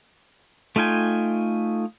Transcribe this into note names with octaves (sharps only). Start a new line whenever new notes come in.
A3 D#4 F4 G5 G#5